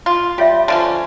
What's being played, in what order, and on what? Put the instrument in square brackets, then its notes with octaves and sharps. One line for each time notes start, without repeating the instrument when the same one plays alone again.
[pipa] F4
[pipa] G3 [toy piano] F4 C#5 E5
[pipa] D3 F3 C#4